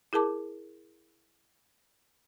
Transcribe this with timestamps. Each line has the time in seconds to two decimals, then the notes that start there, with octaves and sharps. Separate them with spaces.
0.13 E4 G#4 A#4 A5 D6